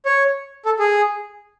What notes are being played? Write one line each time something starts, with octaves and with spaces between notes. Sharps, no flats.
C#5
A4
G#4